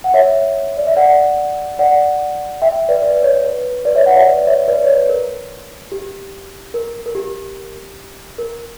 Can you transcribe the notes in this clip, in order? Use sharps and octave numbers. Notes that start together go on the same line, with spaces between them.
F#5
C#5 E5
D5
E5
D5 F#5
D5 F#5
E5 G5
B4 D5
B4 D5
C#5
B4
B4 D5
C#5 E5
D5 F#5
C#5 E5
B4 D5
C#5 E5
B4 D5
C#5
B4
A#4
G4
A#4
A#4
G4
A#4